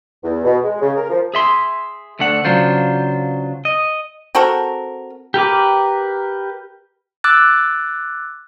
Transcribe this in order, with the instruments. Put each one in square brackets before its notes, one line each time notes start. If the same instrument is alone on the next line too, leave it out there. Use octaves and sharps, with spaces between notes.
[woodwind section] E2
B2
G#3
C#3
A#4
F3
[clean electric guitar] G#4 E5 C6
D2 A3 D4 F#5
C#3 F#3 D4 F4 C5
D#5
[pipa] C4 F#4 A4 A#4
[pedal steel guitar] G4 A#4 B4 D6
[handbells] D6 E6 F#6 A6